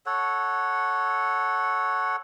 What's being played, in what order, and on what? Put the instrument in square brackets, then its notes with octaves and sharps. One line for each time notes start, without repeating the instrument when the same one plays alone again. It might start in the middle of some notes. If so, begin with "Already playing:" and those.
[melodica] A4 C#5 F#5